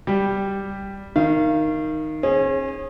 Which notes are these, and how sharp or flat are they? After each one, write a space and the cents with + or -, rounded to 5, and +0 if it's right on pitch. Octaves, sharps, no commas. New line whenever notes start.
G3 +0 G4 +0
D#3 +0 F5 -30
C#4 -40 G#4 +0